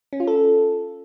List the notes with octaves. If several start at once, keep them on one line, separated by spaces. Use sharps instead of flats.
C#4
F4
A4